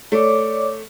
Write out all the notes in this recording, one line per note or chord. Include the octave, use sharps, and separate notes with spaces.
A3 C#5 D5 D6